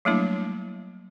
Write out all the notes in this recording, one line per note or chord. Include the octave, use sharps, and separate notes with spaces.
F#3 G3 A3 A#3 D4 E4